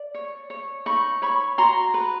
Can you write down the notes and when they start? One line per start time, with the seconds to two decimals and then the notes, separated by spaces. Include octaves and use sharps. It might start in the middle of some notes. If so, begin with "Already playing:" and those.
Already playing: D5
0.15 C#5
0.50 C#5
0.86 D#4 B5 C#6
1.22 C#5 B5 C#6
1.58 F#4 A#5 C6
1.94 B4